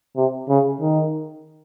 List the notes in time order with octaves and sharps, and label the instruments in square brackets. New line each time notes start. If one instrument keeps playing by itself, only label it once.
[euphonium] C3
C#3
D#3